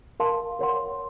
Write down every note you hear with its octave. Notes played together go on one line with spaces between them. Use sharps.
A#4 F5 A5 C6
A#4 C#5 F#5 C6